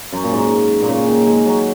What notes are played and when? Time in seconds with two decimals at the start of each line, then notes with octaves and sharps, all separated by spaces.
0.12 F#2
0.24 A#2
0.32 G#2
0.82 A#2
0.88 C#3
1.07 D#3
1.27 G#3
1.46 F#3